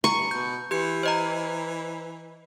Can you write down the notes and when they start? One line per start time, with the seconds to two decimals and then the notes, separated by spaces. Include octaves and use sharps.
0.04 G2 A#5 C#6
0.31 B2 G6
0.71 E3 G4 G6 C#7
1.03 C5 D#5 A#5